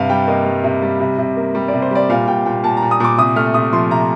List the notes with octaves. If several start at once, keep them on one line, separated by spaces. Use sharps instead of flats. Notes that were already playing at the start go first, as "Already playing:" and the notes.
Already playing: G2 C3 F5
G3 G5
A#3 D#5
G3
C3
G3
C3
C3
A#3
G3
D5
C3
C5
G3 D5
A#2 F5
A#2 G5
A#2 G5
A#2 A5
A#5
A#2
D#6
A#2 D6
C3 D#6
A3 F6
C3 D#6
F3 C6
C3 A#5